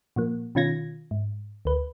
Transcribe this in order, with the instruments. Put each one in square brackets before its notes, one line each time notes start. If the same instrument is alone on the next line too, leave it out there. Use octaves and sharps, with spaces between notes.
[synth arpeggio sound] A#2 F3 A#3
B2 D#3 C#4 F4 G#6 A#6
G#2
D2 B4